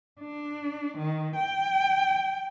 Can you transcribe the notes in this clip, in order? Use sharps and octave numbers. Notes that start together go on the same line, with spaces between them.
D4
D#3
G5